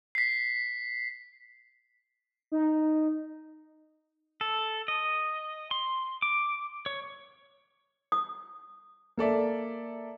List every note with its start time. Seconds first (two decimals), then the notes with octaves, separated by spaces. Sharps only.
0.15 B6 C7
2.52 D#4
4.41 A4
4.88 D#5
5.71 C6
6.22 D6
6.86 C#5
8.12 D#6
9.17 A#3 A4 D5 E5